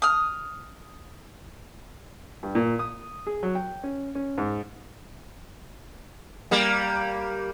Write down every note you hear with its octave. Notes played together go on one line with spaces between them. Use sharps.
D#6 F6
G2
A#2
D#6
G#4
F#3
G5
C#4
C#4
G#2
G3 A#3